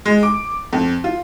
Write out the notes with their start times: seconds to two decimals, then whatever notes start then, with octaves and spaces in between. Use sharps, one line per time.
0.06 G#3
0.23 D6
0.73 F2
1.04 F4